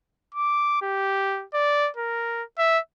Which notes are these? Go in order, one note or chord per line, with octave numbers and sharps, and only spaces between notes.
D6
G4
D5
A#4
E5